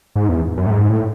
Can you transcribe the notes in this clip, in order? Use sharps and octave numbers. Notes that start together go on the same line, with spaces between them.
G#2
E2
F#2
A2
G#2
A2